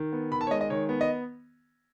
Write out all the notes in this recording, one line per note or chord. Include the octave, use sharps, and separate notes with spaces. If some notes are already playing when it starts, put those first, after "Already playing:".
Already playing: D#3
B3
D#3 B5
A5
C#5
G#3 D#5
D#5
D#3 C#5
B3
D#5